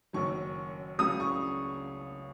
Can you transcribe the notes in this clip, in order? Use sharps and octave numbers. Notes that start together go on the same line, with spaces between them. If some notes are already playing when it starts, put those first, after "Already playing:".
F#1 F#2 D#3 F#3 C#6
C#2 C#3 F#3 D#6
C#6